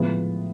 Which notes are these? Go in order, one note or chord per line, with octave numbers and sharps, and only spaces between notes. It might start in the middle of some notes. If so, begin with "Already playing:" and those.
Already playing: A2 F3 G#3 B3